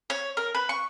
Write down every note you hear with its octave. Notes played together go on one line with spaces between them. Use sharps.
C#5
A#4
B4
C#6